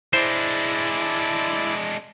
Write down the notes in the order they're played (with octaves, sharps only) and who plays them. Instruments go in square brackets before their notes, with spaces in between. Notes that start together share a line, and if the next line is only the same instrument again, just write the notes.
[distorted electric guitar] G#3 D4 [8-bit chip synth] E4 D5 [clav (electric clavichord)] C5